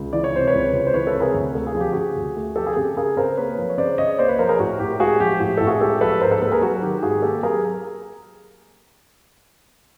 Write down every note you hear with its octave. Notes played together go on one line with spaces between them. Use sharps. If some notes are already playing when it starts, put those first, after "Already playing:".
Already playing: C#2
E3 D5
C#5
C3 C5
B4 C#5
C#2
C#2
C5
E3 B4 C#5
A4 B4
C3
G#4 A#4
D2
A3 A4
G#4
F3
G4
C#3 F#4 G#4
D2
A3
F3 G4 A4
G#4
C#3 G4 A4
C#3 G#4 A#4
C#3 A#4 C5
A#3 B4 C#5
F3
C#5
C#3 C5 D5
C#3 C#5 D#5
A#3 C5 D5
B4 C#5
F3 A#4 C5
G#4 A#4
A2 F#4
A2 G4
G#3 F#4 G#4
F3 G4
A2 F#4
A2 A4
F#4 G#4
G#3 G4 A4
F3 A4 B4
G#2 A#4 C5
A4 B4
A#3 A4 B4
G#4 A#4
F#3 F#4
D#3 G4
G#2 F#4 G#4
A#3 G4 A4
F#3 G#4 A#4